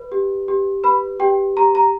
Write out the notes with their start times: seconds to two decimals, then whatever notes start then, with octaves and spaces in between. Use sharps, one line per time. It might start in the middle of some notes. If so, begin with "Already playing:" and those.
Already playing: B4
0.12 G4
0.48 G4
0.84 B4 B5
1.20 G4 G5
1.57 G4 A#5
1.75 A#5